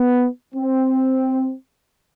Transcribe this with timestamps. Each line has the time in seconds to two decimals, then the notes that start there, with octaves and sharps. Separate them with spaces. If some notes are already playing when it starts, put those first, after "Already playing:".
Already playing: B3
0.55 C4